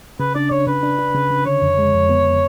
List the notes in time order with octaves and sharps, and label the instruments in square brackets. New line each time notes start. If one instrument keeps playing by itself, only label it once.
[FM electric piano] C#3 [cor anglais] B4
[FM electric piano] D4 [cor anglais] D5
[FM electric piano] C#3 [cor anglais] C#5
[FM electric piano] C#3 [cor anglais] B4
[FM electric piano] D4
D4
C#3
C#3
[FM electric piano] D3 [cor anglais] C#5
[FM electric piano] F2
G#3
F2
B3